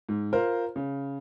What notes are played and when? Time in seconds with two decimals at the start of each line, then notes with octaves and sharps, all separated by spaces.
0.09 G#2
0.33 F4 A#4 C5
0.76 C#3